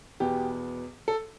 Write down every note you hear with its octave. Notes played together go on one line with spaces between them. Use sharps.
E2 B2 B3 G4
A4